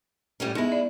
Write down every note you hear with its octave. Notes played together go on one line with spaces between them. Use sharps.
A2 G3 C#4
G#3 B3 D#4 E4
D5